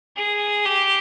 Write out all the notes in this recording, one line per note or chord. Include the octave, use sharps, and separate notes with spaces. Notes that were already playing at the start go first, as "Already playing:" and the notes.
G#4
G4